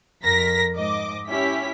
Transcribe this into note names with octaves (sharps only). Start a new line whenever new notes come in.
F2 A#4 A#6 B6
G#2 D#5 D6
C#4 E4 G4 B6